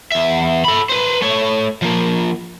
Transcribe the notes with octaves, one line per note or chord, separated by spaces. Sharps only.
E2 E5
A4 B5
B4 C5
A3 C#5
F3 A#3